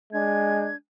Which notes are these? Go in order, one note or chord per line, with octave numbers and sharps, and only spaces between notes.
G#3 D4 G#6